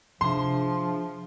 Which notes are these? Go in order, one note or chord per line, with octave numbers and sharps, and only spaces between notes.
C3 F3 D4 F4 G#4 E5 C6